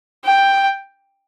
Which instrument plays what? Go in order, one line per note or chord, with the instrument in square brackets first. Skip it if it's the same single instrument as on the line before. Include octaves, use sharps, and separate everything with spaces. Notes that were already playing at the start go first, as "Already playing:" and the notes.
[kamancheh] G5